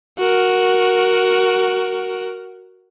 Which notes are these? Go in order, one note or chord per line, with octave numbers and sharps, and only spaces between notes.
F#4 A#4